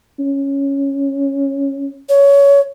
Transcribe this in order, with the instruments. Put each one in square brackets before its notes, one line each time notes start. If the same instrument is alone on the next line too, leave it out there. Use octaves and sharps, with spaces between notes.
[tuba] C#4
[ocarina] C#5